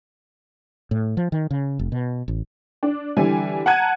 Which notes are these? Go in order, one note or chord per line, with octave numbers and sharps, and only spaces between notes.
A2
F3
D#3
C#3
F1
B2
A1
D4
D3 E3 G3 G#5
F#5 A5 A#5 F#6 G#6 D#7